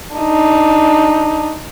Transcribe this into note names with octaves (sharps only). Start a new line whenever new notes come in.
D4 D#4